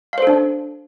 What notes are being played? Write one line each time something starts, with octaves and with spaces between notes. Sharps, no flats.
D4 A4 C5 F5